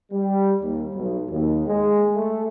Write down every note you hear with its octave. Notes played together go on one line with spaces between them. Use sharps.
G3
D#2
B1
D#2
G#3
A3